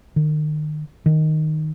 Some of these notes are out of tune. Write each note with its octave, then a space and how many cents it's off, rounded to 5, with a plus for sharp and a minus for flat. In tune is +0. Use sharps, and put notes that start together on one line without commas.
D#3 -35
D#3 -5